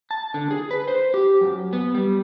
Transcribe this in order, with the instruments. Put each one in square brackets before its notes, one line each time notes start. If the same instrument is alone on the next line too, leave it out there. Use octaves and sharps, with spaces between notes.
[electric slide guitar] A5
D3
G#4
B4
C5
G4
F#2
B3
G3